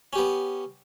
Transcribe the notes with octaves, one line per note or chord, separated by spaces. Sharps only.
B3 C#4 G4